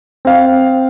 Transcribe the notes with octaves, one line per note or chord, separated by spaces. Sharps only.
C4 F5